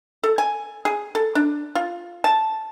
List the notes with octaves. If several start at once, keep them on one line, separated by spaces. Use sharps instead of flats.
A4
G#5
G#4
A4
D4
F4
A5